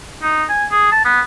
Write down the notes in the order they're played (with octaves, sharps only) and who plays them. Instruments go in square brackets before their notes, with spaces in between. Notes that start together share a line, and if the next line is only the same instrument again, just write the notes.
[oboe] D#4
G#5
G#4
A5
B3